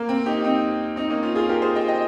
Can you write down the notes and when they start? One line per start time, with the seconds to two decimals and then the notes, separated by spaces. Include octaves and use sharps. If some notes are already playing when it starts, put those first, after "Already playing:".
Already playing: A#3
0.09 C4
0.26 D#4 G4
0.44 C4 D#4
0.96 C4 D#4
1.09 A#3 C#4
1.23 C#4 F4
1.35 F4 G#4
1.49 G4 A#4
1.62 G#4 C5
1.75 D#5 G5
1.88 D#5 G5